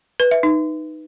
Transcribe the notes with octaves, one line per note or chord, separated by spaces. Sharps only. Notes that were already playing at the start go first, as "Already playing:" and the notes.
B4
E5
D#4